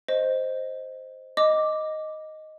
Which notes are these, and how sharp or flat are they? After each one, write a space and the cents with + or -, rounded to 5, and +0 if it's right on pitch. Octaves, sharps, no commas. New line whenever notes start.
C5 +0 D#5 +0
D#5 +0 D6 +0